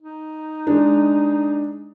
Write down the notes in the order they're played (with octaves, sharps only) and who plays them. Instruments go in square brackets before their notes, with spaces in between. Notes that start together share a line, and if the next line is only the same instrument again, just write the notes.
[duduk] D#4
[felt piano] G#3 D4